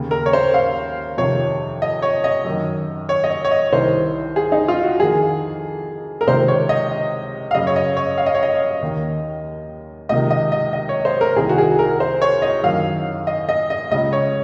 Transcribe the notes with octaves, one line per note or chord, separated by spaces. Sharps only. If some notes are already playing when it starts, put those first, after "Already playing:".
Already playing: D#2 C#3
A#4
C#5
C5
F5
F2 C3 D#3 C#5
D#5
C#5
D#5
F#2 D#3
C#5
D#5
C#5
C#5
D#5
C2 C3 D#3 C5
G#4
D#4
F4
F#4
F2 D#3 G#4
A#4
C#2 C3 D#3 C5
C#5
D#5
F5
F#2 C#3 D#5
C#5
D#5
C#5
F5
D#5
C#5
D#5
D#2 D#3
C#2 C3 D#3 D#5
D#5
D#5
D#5
C#5
C5
A#4
C2 C3 D#3 G#4
F#4
G#4
A#4
C5
C#5
D#5
F#2 D#3 F5
D#5
D#5
D#5
C#2 C#3 D#5
C#5